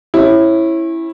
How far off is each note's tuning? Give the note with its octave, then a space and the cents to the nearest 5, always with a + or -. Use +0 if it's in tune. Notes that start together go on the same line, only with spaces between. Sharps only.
C#4 -30 E4 +0